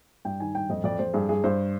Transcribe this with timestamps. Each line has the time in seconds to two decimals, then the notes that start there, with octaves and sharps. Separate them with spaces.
0.25 G2 G5
0.40 D#3 G#5
0.55 G2 G5
0.70 F2 D#5
0.84 F2 D5
0.99 F2 C5
1.14 G2 G#4
1.29 G2 G#4
1.44 G2 C5